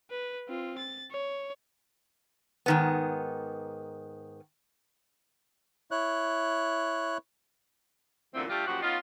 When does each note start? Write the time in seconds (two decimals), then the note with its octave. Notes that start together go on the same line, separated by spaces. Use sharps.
0.10 B4
0.48 C4 F4
0.78 A6
1.11 C#5
2.66 G#2 D#3 B3
5.91 E4 C#5 F#6
8.34 F#2 A#2 D3 E3 A3 C4
8.49 G3 A3 D4 F4 G4
8.67 F#2 A#2 F3 F#4 G4 F#5
8.82 B3 C#4 D#4 F4